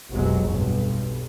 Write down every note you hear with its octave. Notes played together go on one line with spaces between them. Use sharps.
F1 B1 F#3 G#3
B1 G2